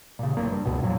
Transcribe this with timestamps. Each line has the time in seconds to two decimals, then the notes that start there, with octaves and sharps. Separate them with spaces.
0.19 A#2 C#3
0.37 A1 F#2 A#3
0.50 G2
0.65 C#2 G2 B2
0.81 A1 F2 A#2 F#3